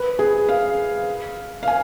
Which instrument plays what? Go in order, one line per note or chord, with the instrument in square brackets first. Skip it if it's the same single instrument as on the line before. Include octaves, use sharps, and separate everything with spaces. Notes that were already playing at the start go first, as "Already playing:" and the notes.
Already playing: [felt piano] B4
G#4
F5
F5
G#5